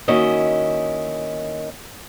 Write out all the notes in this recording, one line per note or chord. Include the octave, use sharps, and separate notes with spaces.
D#3 A#3 C#4 E4 F#4 D#5